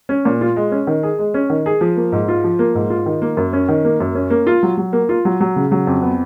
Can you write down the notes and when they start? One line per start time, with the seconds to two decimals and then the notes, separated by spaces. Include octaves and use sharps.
0.09 C#4
0.25 A#2
0.41 F4
0.56 G#3
0.72 C#4
0.87 D#3
1.03 G#4
1.19 G#3
1.34 C#4
1.50 D#3
1.66 G#4
1.81 F3
1.97 A#3
2.12 G#2
2.28 F4
2.44 F3
2.59 A#3
2.75 G#2
2.90 F4
3.06 D#3
3.22 A#3
3.37 F#2
3.53 C#4
3.69 D#3
3.85 A#3
4.00 F#2
4.15 C#4
4.30 A#3
4.47 F4
4.63 F#3
4.77 F#3
4.93 A#3
5.09 F4
5.25 F#3
5.40 F#3
5.56 C#3
5.71 F#3
5.87 F2
6.03 B3